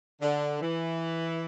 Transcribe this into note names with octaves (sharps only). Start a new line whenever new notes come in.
D3
E3